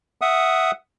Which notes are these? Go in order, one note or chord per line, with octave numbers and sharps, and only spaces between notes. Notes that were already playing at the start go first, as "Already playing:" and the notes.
E5 F#5 D#6